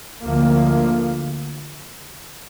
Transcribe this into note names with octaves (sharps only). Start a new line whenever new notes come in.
D2 D3 F3 A#3